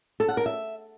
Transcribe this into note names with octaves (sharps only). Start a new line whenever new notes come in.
A4
F#5
A#4
E5